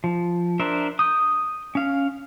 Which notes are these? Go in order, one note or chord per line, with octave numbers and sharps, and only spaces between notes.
F3
D4 A#4 C5 E5
D#6 G6
C#4 F5